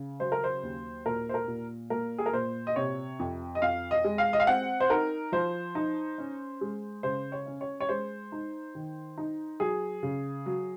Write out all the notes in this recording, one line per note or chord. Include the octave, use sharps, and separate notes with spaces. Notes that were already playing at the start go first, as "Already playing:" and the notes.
Already playing: C#3
F#3 C5
A#4
C5
D#2
A#2 A#4
C5
A#4
A#2
A#3 A#4
G#4
A#4
A#2 C5
D#5
C3 C#5
F2
D#5
F2 F5
D#5
G#3
F5
D#5
F5
C4 F#5
C5
D#4 A#4
F3 C5
D#4
C#4
G#3
C#3 C5
C#5
C#4
C#5
C#5
G#3 C5
D#4
D#3
D#4
F#3 G#4
C#3
F#3